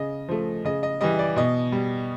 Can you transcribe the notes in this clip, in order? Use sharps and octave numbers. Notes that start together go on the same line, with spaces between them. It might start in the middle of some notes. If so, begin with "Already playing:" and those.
Already playing: C#3 D#5
F3 A3
C#3 D#5
D#5
E3 G3 D#5
D5
B2 D#5
G3